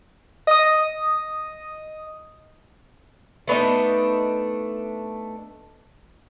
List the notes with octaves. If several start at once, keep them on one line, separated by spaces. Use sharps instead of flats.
D#5 D#6
A3 B3 D4 D#4